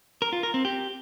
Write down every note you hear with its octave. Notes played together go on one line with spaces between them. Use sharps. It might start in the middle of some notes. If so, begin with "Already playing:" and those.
A#4
F4
A#4
C4
G4